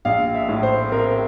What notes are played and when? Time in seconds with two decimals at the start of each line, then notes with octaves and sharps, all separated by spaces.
0.05 A#1 F5
0.35 E5
0.49 A2
0.63 C5
0.92 C4 A#4